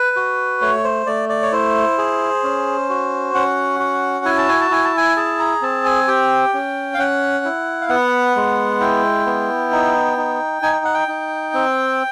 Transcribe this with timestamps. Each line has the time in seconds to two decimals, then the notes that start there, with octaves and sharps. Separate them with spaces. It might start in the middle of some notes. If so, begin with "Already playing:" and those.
Already playing: B4
0.16 F#4
0.61 A3 C#5
0.84 C5
1.06 A3 D5
1.29 D5
1.42 C#5
1.52 E4 C5
1.98 G#4
2.44 C#4
2.89 F#4
3.35 C#4 F#5
3.80 F#4
4.25 E4 G#5
4.38 A5
4.49 G#5
4.61 A5
4.71 E4 G#5
4.85 A5
4.97 G#5
5.17 G#4 A5
5.39 A#5
5.62 C4 A5
5.85 G#5
6.08 G4 G5
6.54 C#4
6.94 F5
6.98 C#4 F#5
7.45 E4
7.81 F5
7.89 B3 F#5
8.36 G#3
8.80 E4 G5
9.26 B3
9.72 D#4
10.17 D#4
10.62 D#4 G#5
10.73 G5
10.85 F#5
10.95 G5
11.08 D#4
11.54 C4